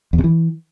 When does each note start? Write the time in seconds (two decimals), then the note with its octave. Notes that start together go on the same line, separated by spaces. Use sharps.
0.13 E2
0.18 C3
0.24 E3